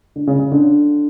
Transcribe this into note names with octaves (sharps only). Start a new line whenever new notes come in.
D3
C#3
C#3
D3